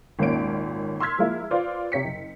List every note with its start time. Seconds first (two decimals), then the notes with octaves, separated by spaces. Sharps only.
0.19 G#1 D#2 A#2 C#4 D7
1.00 C6 E6 F6 G#6 B6
1.18 F3 G#3 A#3 E4
1.51 F4 B4 C5 D5 F5
1.92 C3 C#5 B6 C#7
2.04 F#1